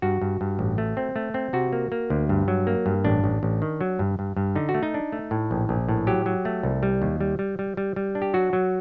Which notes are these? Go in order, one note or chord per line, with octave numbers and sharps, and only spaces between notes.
G2 F#4
G2
G2
A1
A3
C4
A3
C4
C3 F#4
A#3
A#3
D2
G2
F#3
A#3
G2
A1 D4
A1
A1
D#3
F#3
G2
G2
G2
D3 D#4
F#4
A3
D#4
D4
A3
A2
A#1
A#1
A2
F#3 G4
F#3
A3
C2
G3
D#2
G3
G3
G3
G3
G3
D4
G4
F#3 F#4
F#3